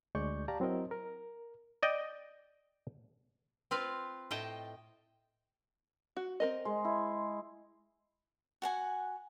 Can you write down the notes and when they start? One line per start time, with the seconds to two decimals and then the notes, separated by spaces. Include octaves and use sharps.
0.15 D2 G#3 D5 C#6 G6
0.48 G4 D5 F5 A5 A#5
0.60 F#3 C4 E4 A#4 D#5
0.91 A#4
1.83 D5 D#5 G5
3.71 C4 F4 B4 F5
4.31 A2 D#5 G5 A5
6.17 F#4
6.40 C4 A#4 D#5
6.65 G#3
6.85 E4
8.62 F#4 F#5 G#5